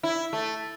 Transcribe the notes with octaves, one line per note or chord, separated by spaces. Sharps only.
E4
A3